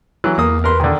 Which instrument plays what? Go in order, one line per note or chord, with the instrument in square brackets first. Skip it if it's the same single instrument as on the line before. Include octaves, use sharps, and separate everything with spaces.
[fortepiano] E3 F#3
[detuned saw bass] E2 [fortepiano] A#3 D#6
[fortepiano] A#4 B4 C6
D3 D#3